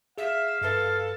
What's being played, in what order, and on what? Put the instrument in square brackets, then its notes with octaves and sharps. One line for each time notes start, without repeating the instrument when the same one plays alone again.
[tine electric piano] G#4 [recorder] E5 [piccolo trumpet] F5
[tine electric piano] G2 B4 [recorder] A4